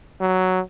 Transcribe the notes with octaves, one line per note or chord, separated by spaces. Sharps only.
F#3